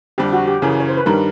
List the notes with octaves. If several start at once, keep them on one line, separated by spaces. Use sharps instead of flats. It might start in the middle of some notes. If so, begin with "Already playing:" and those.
F2 D3 G3 G4
F#4
G4
F#2 C#3 E3 G#4
C#5
C5
B4
G2 D#3 G3 A#4